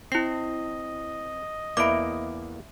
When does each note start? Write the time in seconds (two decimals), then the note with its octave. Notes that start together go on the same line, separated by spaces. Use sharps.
0.12 C4 E4 D#5 C7
1.77 E2 E3 A#3 D5 E5 B5 D6 D7